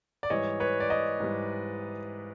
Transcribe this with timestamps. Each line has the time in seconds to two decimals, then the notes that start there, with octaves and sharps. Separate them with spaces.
0.23 D5
0.30 G#2 E3 G3 C#5 D#5
0.60 B4 C#5
0.80 D5
0.90 C#5 D#5
1.20 G#2 E3 G3